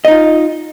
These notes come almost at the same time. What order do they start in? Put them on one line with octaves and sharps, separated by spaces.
D#5 D#4 F4